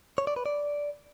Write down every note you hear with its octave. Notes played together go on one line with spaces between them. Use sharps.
C#5
D5
B4
D5